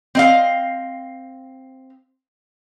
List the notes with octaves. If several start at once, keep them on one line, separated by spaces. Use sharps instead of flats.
C4 D#5 F5